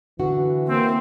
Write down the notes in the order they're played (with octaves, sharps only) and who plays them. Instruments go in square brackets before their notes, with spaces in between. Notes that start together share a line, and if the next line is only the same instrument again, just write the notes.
[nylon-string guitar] D3 F#4 [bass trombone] E3
[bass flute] A#3 [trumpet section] C4